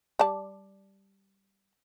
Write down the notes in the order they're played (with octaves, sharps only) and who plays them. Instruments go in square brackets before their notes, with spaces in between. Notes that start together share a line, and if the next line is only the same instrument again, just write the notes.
[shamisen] G3 D5 A5